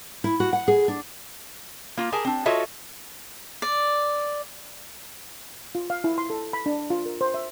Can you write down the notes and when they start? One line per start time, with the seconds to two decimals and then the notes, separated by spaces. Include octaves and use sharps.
0.24 E4
0.40 F#4
0.53 F#5
0.68 G#4
0.88 D4
1.97 A#3 F4
2.12 G4 G#4 A#4 G#5 A5
2.25 C4 D4
2.46 F4 F#4 A4 C#5 D#5 E5
3.62 D5
5.75 F4
5.90 F5
6.04 E4
6.18 C6
6.30 A4
6.53 B5
6.66 D4
6.90 F4
7.06 A#4
7.21 C5
7.34 E5